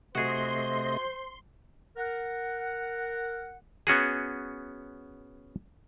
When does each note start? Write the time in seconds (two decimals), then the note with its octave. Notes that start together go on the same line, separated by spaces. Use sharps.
0.15 C3 A3 F#4 G#4 C5 D#5 C6
1.96 A#4 F#5
3.87 B3 C#4 F#4 G#4